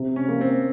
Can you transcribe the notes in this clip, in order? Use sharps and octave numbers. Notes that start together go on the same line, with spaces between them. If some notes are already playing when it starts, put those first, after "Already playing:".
Already playing: C3
C#4
A#3
C4